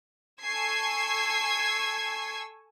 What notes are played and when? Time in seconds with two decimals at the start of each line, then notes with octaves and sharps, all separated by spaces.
0.43 A4 G#5 C#6 E6 G#6 C7